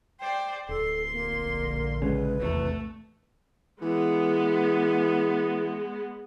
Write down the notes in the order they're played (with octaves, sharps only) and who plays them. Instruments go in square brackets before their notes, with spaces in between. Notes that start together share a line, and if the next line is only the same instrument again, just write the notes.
[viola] C5 D5 [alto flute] G5
[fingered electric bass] D1 [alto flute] A4 [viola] C6
[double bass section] A#1 D3 [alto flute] A#3
[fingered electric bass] C#3 G#3 C#4 [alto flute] B4
[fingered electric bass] D#1 E2 C3 [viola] A3
[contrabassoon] E3 [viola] G#3 B3